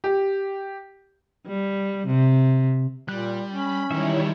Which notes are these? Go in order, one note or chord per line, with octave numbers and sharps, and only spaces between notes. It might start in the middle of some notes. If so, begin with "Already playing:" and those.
G4
G3
C3
A#2 G3 F#6
C#4 B5
D#3 E3 G3 G#3 E4 C#5 E5